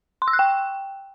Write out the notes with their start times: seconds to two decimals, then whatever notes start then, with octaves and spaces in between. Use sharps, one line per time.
0.22 C6
0.28 E6
0.33 F#6
0.39 G5